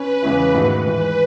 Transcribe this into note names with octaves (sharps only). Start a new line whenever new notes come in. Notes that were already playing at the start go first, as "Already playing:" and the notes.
Already playing: C#4 B4
E2 C#3 G#3 C#4 E4
G#2 D#3 A3 D#4 F#4
G#2 E3 G#3 B4